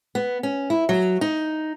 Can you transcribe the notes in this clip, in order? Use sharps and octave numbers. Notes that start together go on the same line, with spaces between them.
B3
C#4
E4
F#3
D#4